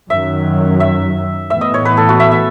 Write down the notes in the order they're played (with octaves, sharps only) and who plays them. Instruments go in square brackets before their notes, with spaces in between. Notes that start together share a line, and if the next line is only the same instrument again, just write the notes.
[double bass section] F#2 D#3 F#3 [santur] E5
[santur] E5
[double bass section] A2 E3 B3 [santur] E5
[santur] D#5
C#5
B4
A4
F#4
E5
E5